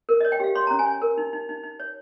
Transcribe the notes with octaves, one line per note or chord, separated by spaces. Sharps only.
A#4
D#5
C#5
G5
G4 F5
C#5 C6
A#5
C#4
G#5
C#5
A#4
D#4
D#4
D#4
D#4
C#5